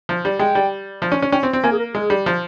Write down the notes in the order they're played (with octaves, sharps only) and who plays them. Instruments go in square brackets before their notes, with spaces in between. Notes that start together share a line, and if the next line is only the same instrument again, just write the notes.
[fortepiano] F3
G3
[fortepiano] G#3 [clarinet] G5
[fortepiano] G3
F3
C#4
C#4
[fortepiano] C#4 [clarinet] G5
[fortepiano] C4
C4
[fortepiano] A#3 [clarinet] G#5
[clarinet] G#4
A#4
[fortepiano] G#3 [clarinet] G#4
[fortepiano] G3
F3